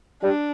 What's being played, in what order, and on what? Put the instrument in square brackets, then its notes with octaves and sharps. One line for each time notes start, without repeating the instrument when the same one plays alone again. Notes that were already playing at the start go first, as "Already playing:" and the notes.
[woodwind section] G3 [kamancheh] D4